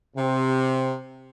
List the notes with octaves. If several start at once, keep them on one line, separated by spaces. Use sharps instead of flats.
C3